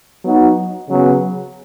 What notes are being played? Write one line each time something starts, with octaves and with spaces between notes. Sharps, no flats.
F#3 B3 D#4 F#4
C#3 F#3 B3